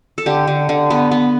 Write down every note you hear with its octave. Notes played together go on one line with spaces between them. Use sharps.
A4
D3 G4
D3
D3
B3
B3